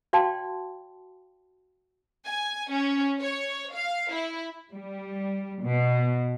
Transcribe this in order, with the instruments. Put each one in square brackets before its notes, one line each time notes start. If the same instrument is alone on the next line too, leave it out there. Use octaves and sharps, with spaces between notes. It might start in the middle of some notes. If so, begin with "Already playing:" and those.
[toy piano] F#4 D5 F5 G5 A5 C6
[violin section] G#5
C#4
C#5
F5
E4
[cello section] G3
B2